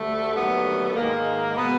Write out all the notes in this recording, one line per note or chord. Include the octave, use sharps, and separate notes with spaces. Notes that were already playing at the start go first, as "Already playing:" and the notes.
Already playing: D2 D3 G3 A3
D#2 D3 F#3 A3 B3
G#2 D#3 G#3 A#3
B2 G#3 B3